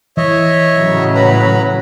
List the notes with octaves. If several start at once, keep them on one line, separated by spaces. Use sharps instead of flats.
E3 C#5 D#5 E5
A2 C#3 F#3
B4 A#5 B5